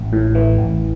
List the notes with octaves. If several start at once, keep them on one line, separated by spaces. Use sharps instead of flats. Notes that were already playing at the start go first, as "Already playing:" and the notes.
Already playing: A1
A2
E3
A1